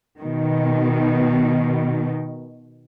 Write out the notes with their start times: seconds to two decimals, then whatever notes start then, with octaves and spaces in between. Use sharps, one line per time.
0.19 B2 D#3